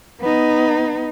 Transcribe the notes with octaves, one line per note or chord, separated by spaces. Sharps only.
B3 D#4